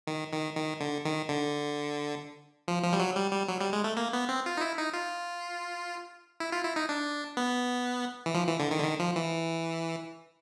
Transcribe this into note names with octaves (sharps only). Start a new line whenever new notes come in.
D#3
D#3
D#3
D3
D#3
D3
F3
F3
G3
F#3
G3
G3
F#3
G3
G#3
A3
A#3
B3
C4
F4
D#4
E4
D#4
F4
E4
F4
E4
D#4
D4
B3
E3
F3
E3
D3
D#3
D3
D#3
F3
E3